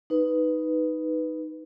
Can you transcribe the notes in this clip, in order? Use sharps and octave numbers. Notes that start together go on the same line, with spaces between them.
D#4 B4